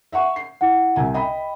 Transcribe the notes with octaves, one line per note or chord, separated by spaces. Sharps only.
E5 F#5 C#6
C7
E4 F#5
C2 C3 G#5
D#5 G5 B5